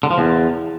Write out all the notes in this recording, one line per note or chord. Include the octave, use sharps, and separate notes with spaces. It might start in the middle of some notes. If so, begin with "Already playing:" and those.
D3
F3
E2